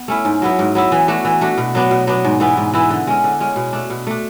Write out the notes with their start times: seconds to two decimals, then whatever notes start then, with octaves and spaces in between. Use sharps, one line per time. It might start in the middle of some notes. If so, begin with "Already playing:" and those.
Already playing: B3
0.08 A3 C#4 E4
0.25 G#2
0.42 F#3 B3 E4
0.59 G#2
0.75 F#3 B3 E4
0.92 E3
1.08 A3 D4 F#4
1.25 E3
1.41 A3 D4 F#4
1.58 B2
1.75 F#3 B3 D4
1.91 B2
2.07 F#3 B3 D4
2.24 G#2
2.40 E3 B3 E4
2.57 G#2
2.74 E3 B3 E4
2.90 D3
3.07 G#3 C#4
3.24 D3
3.40 G#3 C#4
3.56 B2
3.73 A3 D4
3.90 B2
4.07 A3 D4